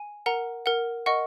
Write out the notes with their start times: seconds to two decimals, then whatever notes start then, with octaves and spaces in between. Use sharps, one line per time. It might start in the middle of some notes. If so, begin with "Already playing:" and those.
Already playing: G#5
0.26 A#4 F#5 A#5
0.66 A#4 F#5
1.06 A#4 D#5 F#5 C#6